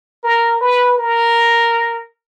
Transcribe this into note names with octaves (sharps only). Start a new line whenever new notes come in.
A#4
B4
A#4